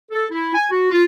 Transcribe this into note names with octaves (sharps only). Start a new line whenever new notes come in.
A4
E4
G#5
F#4
F4